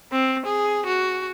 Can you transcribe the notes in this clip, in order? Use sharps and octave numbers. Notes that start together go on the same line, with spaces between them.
C4
G#4
F#4